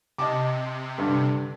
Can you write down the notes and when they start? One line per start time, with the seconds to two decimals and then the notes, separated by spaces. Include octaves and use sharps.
0.18 C3 D#5 A5 D6
0.98 G2 D3